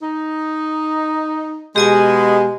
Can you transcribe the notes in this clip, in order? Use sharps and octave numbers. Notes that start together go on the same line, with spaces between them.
D#4
B2 G#3 G4 D#5 G#5